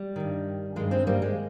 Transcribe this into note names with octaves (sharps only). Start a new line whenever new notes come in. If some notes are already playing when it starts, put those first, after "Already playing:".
Already playing: G3
G2 D#3
G2 D#3 G#3
G#3 C4
G3 A#3
G#3